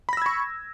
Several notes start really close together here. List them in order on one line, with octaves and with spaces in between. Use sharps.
B5 A#6 E6 G#6 C#6